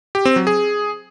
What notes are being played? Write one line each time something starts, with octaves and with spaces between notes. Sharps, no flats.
G4
C4
F#3
G#4